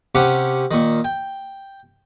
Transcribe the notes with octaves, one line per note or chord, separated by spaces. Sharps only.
C3 C#4 G4 F#5 D6
A#2 D#3
G5